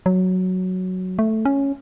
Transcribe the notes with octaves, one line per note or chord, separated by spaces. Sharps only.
F#3
A3
C#4